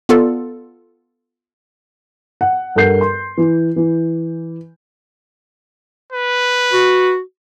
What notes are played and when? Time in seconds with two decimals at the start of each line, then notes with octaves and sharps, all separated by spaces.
0.09 B3 F4 A4 D5
2.41 F#5
2.76 G2 A4 A#4 F#5 G6 C7
3.01 C6
3.38 E3
3.76 E3
6.12 B4
6.73 F#4